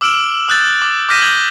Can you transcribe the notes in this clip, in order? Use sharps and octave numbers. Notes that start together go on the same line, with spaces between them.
D6 E6 F6 D7 E7 F#7
D#6 E6 F#6 G6 A6
D6
D6 F6 G6 A#6 B6 D#7
D#6 G6 G#6 F#7 G7